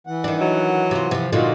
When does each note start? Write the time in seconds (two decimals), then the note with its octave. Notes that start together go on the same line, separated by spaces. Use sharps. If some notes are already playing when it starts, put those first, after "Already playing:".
0.07 E3 F#5
0.24 D#3 D4
0.41 F#3
0.91 C3 F4
1.11 C3 F3
1.33 A#2 D3 D#4 F4 F#4